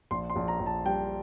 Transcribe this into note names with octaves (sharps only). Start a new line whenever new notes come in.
A#1 C6
C6
A#1
A#5
A#1
A5
G3 G5